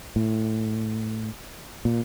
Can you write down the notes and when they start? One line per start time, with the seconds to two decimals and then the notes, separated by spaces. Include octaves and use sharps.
0.16 A2
1.85 A#2